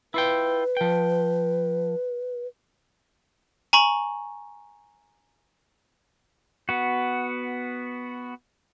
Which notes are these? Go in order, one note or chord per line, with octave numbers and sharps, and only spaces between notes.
E4 F4 B4 G5
F3 G5
G#5 A#5 C#6 F#7
B3 F#4